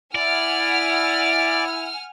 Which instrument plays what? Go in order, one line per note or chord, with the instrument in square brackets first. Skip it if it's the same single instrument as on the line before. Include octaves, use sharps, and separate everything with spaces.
[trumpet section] E4 [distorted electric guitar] D5 [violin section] F#5 G#5 F6